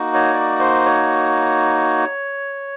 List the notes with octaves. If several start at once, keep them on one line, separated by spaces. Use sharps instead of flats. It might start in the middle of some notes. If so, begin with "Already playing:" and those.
Already playing: A#3 D#4 F#4
C#5
D5
C5
C#5